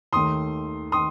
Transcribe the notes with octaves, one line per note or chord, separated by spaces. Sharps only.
D#2 D#3 A3 C6 D#6
D#3 C6 D#6